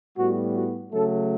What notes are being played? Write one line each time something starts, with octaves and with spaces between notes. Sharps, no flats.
A2 G3 B3 F#4
F#4
C#3 F#3 A3 A4